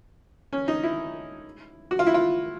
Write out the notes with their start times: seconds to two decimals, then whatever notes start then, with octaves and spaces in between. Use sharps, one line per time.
0.53 C#4
0.68 D#4
0.84 E4
1.91 F#4
1.99 F4
2.07 E4
2.14 F4